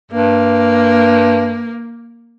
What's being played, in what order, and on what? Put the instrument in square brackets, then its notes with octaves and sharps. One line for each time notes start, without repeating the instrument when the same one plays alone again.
[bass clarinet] G2 [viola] A#3